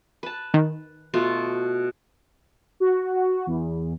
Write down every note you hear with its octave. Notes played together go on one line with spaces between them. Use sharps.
B4 A5
D#3
B2 A3 F4
F#4
E2